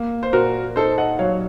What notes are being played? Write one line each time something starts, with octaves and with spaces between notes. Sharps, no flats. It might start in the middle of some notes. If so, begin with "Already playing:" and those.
Already playing: A#3
C5
A#2 F#4 A#4
D#4 A4 C5
D#5 F#5
F#3 C#5 F5